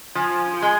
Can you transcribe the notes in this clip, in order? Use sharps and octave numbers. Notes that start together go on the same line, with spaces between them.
F3 G#5
G#3 G#5